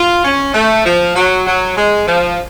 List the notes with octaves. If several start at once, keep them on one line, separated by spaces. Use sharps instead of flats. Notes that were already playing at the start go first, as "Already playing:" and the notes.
Already playing: F4
C#4
A3
F3
F#3
F#3
G#3
F3